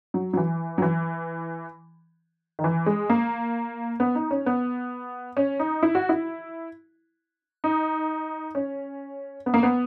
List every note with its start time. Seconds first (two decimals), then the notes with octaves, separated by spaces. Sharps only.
0.14 F#3
0.33 F#3
0.37 E3
0.78 F#3
0.82 E3
2.59 D#3
2.64 E3
2.86 G#3
3.10 A#3
4.00 B3
4.15 D#4
4.31 C#4
4.46 B3
5.37 C#4
5.59 D#4
5.83 E4
5.95 F#4
6.09 E4
7.64 D#4
8.55 C#4
9.46 B3
9.54 A#3
9.63 B3